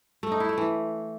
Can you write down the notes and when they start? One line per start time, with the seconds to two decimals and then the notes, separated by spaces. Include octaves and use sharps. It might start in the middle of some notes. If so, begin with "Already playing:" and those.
0.23 A3
0.32 D#4
0.40 E4
0.49 A3
0.58 E3